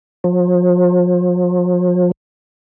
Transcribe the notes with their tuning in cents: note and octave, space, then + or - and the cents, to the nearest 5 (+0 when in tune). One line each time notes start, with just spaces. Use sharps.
F3 +40